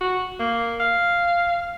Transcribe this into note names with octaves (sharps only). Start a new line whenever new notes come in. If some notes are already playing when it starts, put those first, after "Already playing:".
F#4
A#3
F5